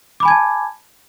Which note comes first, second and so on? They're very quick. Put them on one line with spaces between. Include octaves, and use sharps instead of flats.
D6 B5 G#5 G#6 A5